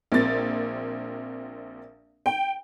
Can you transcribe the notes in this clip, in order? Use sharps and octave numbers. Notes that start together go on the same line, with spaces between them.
A#1 A#2 C4 A6
G5